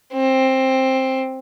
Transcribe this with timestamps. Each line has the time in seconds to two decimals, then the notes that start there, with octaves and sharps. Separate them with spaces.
0.13 C4